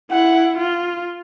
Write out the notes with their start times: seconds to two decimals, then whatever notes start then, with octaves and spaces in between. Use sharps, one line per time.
0.11 E4 F#5
0.58 F4